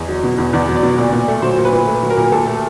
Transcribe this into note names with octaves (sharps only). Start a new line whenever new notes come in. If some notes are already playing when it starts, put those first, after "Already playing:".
Already playing: E2 D#5
F#3
B2
E2
E2 D5
F#3
D5
B2
A#2 D5
A#2
D5
A3
F#3 C5
A#2
B4
A#2
A3 B4
F#3
A#4
A#2
A#2 A4
A3